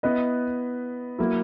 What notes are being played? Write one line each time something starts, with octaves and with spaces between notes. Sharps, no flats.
B3 E4 B4 D#5
F#3 A#3 E4